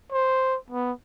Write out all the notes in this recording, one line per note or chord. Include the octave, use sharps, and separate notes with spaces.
C5
B3